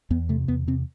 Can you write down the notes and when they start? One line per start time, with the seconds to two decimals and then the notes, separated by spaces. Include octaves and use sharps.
0.10 E2 B3
0.29 C3 A3
0.48 E2 B3
0.67 C3 C4